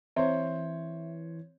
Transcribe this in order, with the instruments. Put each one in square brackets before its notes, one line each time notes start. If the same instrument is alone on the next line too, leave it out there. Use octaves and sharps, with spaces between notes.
[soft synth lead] E3 [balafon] C4 [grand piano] C5 C#5 [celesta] E5